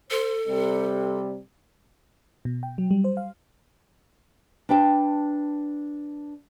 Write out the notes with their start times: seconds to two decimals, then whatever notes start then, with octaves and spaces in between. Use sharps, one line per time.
0.11 A4 C5
0.48 C3 G3
2.45 B2
2.63 G5
2.78 F#3
2.91 G3
3.04 C5
3.17 F5
4.69 D4 B4 G5 A5